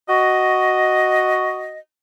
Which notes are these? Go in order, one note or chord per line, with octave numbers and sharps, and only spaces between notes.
F#4 D#5